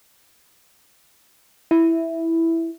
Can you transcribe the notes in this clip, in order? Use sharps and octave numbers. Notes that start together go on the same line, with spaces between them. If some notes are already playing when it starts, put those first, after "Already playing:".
E4